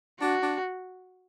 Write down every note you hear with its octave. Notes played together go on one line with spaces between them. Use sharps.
D4 F#4
D4